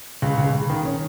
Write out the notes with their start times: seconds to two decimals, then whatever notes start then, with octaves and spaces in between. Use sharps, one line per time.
0.22 C#2
0.38 C#2
0.54 C#2
0.70 D#3
0.85 C#4